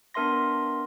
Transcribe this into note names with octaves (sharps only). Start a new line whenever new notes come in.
B3 D4 A#4 E5 C6 A#6